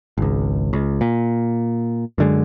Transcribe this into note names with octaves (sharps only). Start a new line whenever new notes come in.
G#1 C#2
C#2
A#2
F#2 D3 G#3